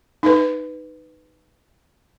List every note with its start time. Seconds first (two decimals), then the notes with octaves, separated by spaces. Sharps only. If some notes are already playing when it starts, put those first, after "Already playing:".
0.23 D#4 B4